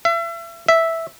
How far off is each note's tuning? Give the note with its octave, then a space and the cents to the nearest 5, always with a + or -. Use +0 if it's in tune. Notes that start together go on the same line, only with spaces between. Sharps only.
E5 +35
E5 -5